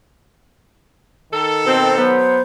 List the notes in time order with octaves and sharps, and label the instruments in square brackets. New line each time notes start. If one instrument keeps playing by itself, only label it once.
[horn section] D#3 A4
[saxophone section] B2 C4
[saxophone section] F#3 B3 [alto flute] C5